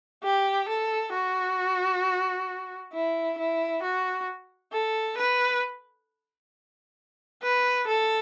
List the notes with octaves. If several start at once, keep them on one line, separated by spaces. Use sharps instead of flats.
G4
A4
F#4
E4
E4
F#4
A4
B4
B4
A4